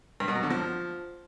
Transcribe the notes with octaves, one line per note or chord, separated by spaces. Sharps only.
G2
B2
F#3
D3
F3